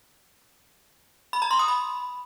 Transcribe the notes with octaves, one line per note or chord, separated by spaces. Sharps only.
B5
A#5
C6
D#6
B5